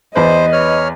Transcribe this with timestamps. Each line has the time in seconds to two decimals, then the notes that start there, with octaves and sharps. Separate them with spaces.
0.15 E2 B4 C5 D#5
0.53 C#5 F6